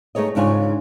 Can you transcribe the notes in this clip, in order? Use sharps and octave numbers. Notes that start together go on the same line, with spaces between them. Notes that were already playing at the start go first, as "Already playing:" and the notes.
A3 D#4 G#4 C#5 D#5
G#2 C#3 D4 F4 C#5 G#5